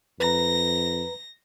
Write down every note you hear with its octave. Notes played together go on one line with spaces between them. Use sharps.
F2 B4 A#5 A#6